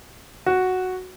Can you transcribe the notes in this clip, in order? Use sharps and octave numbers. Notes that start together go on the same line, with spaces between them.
F#4